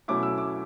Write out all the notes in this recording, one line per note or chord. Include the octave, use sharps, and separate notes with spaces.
B2 F#3 A3 C#4 E4 D6
E6
D6